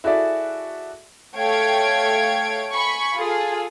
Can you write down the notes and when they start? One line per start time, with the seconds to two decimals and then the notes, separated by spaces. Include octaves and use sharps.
0.04 E4 F#4 G#4 A4 D5 E5
1.37 A3 C#5 F5 G5 G#6 D7
2.73 G#5 B5 C#6
3.16 F4 G#4 A4